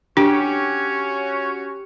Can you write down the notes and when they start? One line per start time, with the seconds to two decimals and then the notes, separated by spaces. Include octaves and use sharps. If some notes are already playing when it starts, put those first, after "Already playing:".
0.17 C#4 D4 F#4 G4 C#5